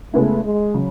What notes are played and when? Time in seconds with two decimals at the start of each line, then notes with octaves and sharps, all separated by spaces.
0.13 C#3 G#3 A3 B3 E4
0.43 G#3
0.74 C#3 F#3